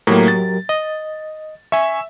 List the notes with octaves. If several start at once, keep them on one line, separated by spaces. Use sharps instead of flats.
A2 F#3 A#3 G4 A#4
A6
D#5
E5 G#5 C#6